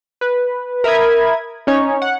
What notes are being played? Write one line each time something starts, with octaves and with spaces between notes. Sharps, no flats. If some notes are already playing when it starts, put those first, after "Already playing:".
B4
A#4 E5 B5 D#6 G#6
C#4 D#4 C#5
F#5